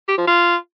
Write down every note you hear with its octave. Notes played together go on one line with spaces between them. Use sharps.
G4
F3
F4